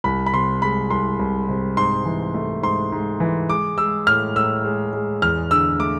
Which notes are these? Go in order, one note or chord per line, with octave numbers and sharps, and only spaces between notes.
C2 B5
B5
C3 C6
G#3 B5
C2 C6
C2
C3
G#2 C6
E3
A3
G#2 C6
G#2
E3
G#3 D6
G#3 E6
A2 F6
A2 E6
G#3
G#3
E2 F6
D3 E6
A3 D6